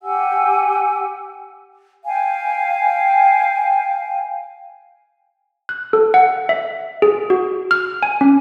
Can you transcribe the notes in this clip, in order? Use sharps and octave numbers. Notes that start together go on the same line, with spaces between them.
G4 F#5 G#5 E6
F5 G5 G#5
F#6
A4
F#5
E5
G#4
F#4
F6
G#5
C#4